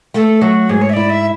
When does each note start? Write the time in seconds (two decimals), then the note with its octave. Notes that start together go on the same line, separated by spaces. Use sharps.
0.14 A3 A4
0.41 F#3 F#4
0.69 G#2 G#4
0.81 C#5
0.89 E5
0.93 E4 D5
1.09 E5